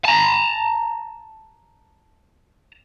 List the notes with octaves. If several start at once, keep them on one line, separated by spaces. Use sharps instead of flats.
A5 A#5